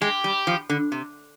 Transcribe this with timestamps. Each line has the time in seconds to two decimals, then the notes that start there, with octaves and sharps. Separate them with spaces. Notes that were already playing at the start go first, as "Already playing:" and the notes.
0.02 G#3 G4
0.24 G3
0.47 F3
0.70 D3
0.92 C3